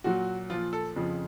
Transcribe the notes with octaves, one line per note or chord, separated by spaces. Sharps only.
A#2 F#3 F#4
A#2 F3 F4
A4
F2 C#3 F3